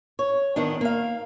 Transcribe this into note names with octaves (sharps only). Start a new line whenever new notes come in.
C#5
D#3 B3 D4
A#3 F5